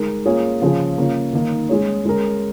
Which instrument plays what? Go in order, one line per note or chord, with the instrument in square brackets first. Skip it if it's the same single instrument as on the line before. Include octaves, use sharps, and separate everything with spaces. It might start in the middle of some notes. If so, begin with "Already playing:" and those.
Already playing: [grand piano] G#3 D#4 A#4
A#3 C#4 F4 G#4 C#5
C#3 F3 C#4 G#4
C#3 A#3 F4 C#5
D#3 A#3 D#4
G#3 C#4 G#4 C#5
G#3 C#4 A#4